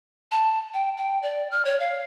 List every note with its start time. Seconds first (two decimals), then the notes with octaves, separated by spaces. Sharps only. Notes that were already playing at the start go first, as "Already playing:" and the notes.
0.31 A5
0.74 G5
0.97 G5
1.22 D5
1.51 F6
1.65 C#5
1.80 F5